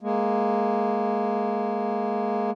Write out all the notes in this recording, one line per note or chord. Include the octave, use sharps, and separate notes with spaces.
G#3 A#3